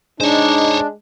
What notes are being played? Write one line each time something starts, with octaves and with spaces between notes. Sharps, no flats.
G#3 D4 D#4 C5 C#5